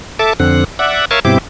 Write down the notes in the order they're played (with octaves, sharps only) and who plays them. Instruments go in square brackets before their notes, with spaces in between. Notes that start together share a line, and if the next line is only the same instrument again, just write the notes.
[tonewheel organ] A4 E5 A5 D6
F2 D3 C4 F#5
D5 E5 F#5
A#4 C#5 E5 F5 G#5 A5
G2 B2 C4 E4 G4 D6